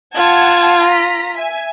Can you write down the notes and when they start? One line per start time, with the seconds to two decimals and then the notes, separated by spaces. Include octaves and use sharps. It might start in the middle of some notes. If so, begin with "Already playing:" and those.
0.15 F4 F#5 A5 G#6
0.88 A#5 B6
1.36 E5 G#5